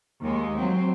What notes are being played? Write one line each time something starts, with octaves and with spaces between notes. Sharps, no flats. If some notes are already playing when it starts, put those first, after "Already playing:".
D#2 G#3
F#3 C4